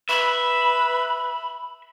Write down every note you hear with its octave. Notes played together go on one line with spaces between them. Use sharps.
B4 E5 B5